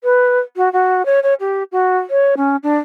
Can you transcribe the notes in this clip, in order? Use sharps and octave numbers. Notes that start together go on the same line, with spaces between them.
B4
F#4
F#4
C#5
C#5
G4
F#4
C#5
C#4
D4